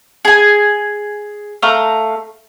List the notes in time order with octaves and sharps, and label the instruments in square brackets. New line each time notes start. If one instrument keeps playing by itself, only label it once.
[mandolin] G#4 G#5
A3 F5 A#5